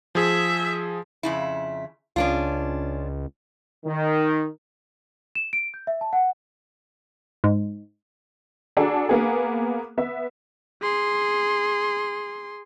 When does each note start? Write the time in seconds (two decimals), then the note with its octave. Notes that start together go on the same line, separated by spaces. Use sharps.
0.15 F3 G#4 E5
1.23 F2 C#3 E4
2.16 C#2 C#4 D4 F4
3.85 D#3
5.35 E7
5.53 D7
5.74 G6
5.87 E5
6.01 A5
6.13 F#5
7.44 G#2
8.77 D4 F#4 G#4 A4 A#5
9.09 A#3 B3 G#4
9.98 B3 E5
10.82 G#4 C6